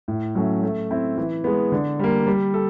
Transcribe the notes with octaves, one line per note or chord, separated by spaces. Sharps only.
A2
F#3 A3 C#4
A3
C4 E4
E3
G#3 B3
D3
G3 A#3
G3
A4